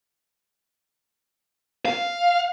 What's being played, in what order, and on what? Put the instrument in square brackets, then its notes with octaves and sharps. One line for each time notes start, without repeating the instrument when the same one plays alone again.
[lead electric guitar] F5